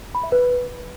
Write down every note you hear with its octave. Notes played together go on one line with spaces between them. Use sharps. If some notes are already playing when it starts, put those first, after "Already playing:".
B5
E5
B4